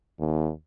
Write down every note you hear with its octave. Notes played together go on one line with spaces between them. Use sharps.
D#2